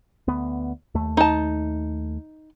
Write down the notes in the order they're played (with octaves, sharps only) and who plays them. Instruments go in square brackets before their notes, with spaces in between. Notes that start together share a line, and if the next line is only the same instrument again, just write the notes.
[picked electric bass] D2 B3
D#2 A3
[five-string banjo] D#4 A5